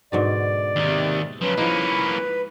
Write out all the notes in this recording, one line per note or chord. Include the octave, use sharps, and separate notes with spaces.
G#2 B2 D3 D5
D#2 C3 D#3
C#3 F3 F#3 B4
F3 G#3 A#3 C#4 D#4 E4